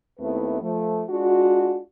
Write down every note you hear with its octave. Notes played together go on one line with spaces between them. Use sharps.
D#2 A3 B3 C4 E4 B4
F3 A3
G#3 D4 F4 F#4